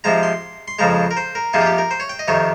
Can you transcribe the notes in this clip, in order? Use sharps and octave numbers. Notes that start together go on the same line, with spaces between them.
C3 F3 G#3 A#5
C6
C6
F2 C#3 F3 G#3 A#5
A#4
C5
A#4
C3 F3 A#3 D#4 G#4
F4
G4
A#4
C5
C#5
G5
D#5
F2 C3 D#3 C#5